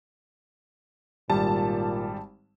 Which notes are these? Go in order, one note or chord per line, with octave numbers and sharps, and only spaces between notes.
G#1 A#2 G3 A5